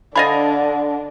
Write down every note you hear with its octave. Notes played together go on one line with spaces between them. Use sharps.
D3 D4 D#5 F5 G#5 B5 A6